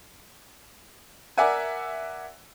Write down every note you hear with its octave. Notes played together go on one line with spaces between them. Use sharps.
A#4 D5 E5 F#5 G#5